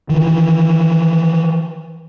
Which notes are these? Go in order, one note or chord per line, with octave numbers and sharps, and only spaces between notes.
D#3 E3